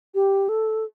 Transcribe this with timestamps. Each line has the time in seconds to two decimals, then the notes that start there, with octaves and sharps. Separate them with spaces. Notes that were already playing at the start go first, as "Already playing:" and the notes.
0.15 G4
0.49 A4